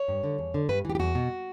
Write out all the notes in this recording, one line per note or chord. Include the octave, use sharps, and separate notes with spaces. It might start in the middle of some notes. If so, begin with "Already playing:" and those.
Already playing: C#5
G2
D3
E2
D3
G2 B4
E3 G4
G4
E2 F#4
B2